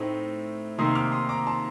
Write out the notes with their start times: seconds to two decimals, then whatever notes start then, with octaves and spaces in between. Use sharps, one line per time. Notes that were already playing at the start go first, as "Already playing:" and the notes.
Already playing: A2 A3 C4 D#4
0.78 C3 D#3 A#3 D#4 C6 D#6
0.95 D6 F6
1.12 C6 D#6
1.29 A#5 D6
1.47 A5 C6